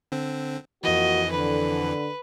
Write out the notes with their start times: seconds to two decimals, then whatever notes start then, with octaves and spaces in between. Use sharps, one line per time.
0.12 D3 C4
0.84 F2 E3 A#3 F4 F#4 D#5
1.32 D3 B4